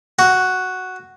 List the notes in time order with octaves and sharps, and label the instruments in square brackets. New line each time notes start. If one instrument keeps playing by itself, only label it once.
[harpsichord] F#4